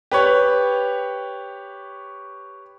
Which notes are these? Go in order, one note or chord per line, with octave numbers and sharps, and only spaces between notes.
G4 B4 C#5